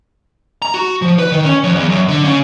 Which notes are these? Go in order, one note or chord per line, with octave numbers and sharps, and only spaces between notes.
A#5
F#4
F3
B4
D#3
C#4
F2
E2
F#2
D3
C#3